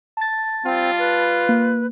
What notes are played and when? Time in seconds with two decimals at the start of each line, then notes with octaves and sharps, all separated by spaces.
0.17 A5 A6
0.64 G3 C4 F4
0.98 B4
1.49 A#3